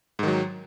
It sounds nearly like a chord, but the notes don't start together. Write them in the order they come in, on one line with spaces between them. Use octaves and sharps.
G#2 D#3 F#3